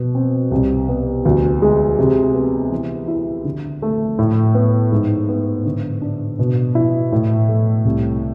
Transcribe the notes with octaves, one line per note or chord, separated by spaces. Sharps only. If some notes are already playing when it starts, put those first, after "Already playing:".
Already playing: B2
C4
C2
B3
D2
G#3
C3
B3
E3
E4
D3
A3
A2
B3
G#2
B3
D3
D4
B2
E4
A2
A3
C2